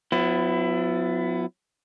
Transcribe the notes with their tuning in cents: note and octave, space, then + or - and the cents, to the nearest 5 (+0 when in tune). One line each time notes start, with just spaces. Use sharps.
F#3 -35 B3 +25 E4 +15